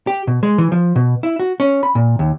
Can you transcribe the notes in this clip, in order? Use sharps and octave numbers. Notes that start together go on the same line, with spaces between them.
G4
B2
G#3
E3
F3
B2
E4
F#4
C#4
B5
A#2
D#2